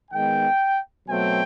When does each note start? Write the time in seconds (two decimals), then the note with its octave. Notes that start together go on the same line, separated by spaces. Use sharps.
0.11 D#3 G#3 B3 G5
1.08 B2 F#3 A3 C4 G5